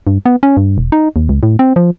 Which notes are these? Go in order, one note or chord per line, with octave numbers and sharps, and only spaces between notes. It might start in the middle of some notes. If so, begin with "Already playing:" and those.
G2
B3
C#4
G2
E1
D#4
D#2
C#2
A2
C4
F3